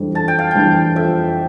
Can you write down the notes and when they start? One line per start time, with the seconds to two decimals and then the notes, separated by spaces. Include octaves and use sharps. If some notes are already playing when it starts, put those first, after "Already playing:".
Already playing: F2 E3 G3 D4
0.15 F2 A5
0.28 G5
0.39 F5
0.51 E3 G3 D4 G5
0.95 F2 E5